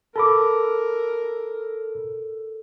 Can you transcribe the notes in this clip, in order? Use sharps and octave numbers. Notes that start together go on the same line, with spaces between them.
A4 A#4 A5 B5 D6